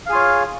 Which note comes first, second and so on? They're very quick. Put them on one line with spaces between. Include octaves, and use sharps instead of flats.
F5 G#4 F4 C#5